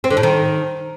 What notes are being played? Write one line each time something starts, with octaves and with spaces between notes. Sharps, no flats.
C4
D3
A2
D#3